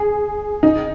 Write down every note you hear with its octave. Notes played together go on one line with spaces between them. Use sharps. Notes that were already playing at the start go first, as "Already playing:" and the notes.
Already playing: G#4
D#4